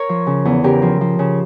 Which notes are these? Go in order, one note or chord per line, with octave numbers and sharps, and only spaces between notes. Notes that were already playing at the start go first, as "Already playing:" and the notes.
Already playing: A#4 C#5
F3
C#3
E2
C#3 G4 A#4
F3
F3
C#3